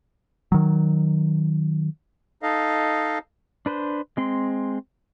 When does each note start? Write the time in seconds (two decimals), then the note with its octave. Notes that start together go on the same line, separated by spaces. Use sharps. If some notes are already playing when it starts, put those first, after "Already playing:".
0.52 D#3 F#3
2.43 D#4 A4 D#5 F5
3.66 D4 B4 C5
4.17 G#3 C4 C6